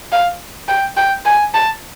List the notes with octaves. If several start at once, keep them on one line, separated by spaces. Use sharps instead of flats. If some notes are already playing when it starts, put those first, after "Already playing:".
F5
G5
G5
G#5
A5